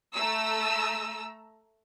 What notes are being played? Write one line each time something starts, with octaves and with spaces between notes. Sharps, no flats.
A3 A#5 E6